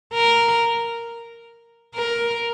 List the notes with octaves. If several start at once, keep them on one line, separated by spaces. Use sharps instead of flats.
A#4
A#4